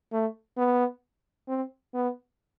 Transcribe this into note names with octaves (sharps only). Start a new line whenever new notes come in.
A3
B3
C4
B3